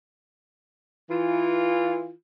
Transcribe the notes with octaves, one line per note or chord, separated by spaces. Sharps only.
E3 F4